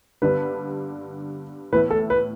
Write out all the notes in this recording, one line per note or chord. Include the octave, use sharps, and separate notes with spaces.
G2 D3 G3 B3 D4 B4
A2 E3 B3 E4 B4
A4
B4